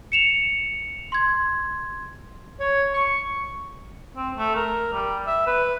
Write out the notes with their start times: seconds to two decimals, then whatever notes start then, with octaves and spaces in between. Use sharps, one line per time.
0.12 C#7 E7 F7
1.12 C6 G#6
2.60 C#5
2.94 C#6
4.17 C4
4.37 A3
4.56 A#4
4.93 G3
5.27 E5
5.47 B4